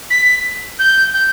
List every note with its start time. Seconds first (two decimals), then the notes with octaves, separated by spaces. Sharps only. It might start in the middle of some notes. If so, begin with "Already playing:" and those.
0.10 B6
0.79 G6
1.14 G6